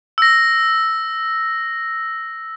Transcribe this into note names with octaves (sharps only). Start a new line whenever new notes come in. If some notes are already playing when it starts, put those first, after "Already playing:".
E6 A#6